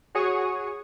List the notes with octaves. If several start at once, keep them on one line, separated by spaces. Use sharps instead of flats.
F#4 G#4 C#5 C#6 D#6